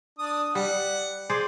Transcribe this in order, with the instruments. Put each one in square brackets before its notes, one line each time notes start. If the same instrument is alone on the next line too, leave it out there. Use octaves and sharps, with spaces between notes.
[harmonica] D4 D#6
[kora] G3 [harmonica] F#5
[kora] G#4 C5 D5